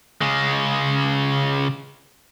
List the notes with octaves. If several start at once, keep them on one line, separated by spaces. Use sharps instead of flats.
C#3 G#3